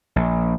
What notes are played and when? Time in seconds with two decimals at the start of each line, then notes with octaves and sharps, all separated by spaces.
0.16 A#1